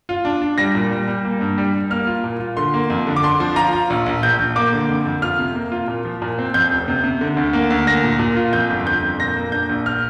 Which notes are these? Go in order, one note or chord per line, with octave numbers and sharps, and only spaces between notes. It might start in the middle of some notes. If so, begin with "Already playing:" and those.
F4
D4
D4
G3 A#6
A#2
G3
G3
A#3
G2
G3
G3
A#3 F6
F4
A#2
F4
D3 C6
A#3
F2
D3
D6
D4 C6
F3
F4 A#5
F4
A#1
A#1
A#1 G6
A#1
A#3 D6
D3
F2
F2
F4 F6
C3
A#3
F4
A#2
F3
A#2
C4
F2 G6
F1
C3
C3
D3
D2
A#3
D2
A#3 A#6
A#2
A#2
F4
F2 G6
G1
G1 G6
F2
A#2 A#6
A#3
D4 G6
A#1
F6